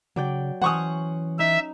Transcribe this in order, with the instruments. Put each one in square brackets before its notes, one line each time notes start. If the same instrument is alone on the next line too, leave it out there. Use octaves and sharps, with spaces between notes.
[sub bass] C#3 [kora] F#3 D5 G5
[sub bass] E3 [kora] C#4 C5 [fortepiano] F#5 C#6 D#6
[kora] D#4 [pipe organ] E5